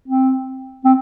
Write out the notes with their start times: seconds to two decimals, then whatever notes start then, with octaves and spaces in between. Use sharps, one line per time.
0.08 C4
0.85 C4